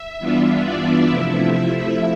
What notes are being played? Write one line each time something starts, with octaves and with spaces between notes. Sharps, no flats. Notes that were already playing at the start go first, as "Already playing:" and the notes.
Already playing: E5
G2 E3 B3 D4 F4
D5
C3 F3 A3 E4 E5